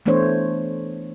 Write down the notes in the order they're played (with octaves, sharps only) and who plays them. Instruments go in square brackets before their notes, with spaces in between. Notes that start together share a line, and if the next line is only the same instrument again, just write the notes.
[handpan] E3 A3 B3 D4 C5 C#5